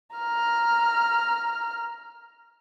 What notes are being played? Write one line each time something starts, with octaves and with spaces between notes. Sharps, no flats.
A#5 F6